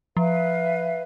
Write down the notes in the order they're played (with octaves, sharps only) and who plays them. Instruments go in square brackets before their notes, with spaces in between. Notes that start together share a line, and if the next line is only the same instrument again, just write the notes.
[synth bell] F3 [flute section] B4 E5 F5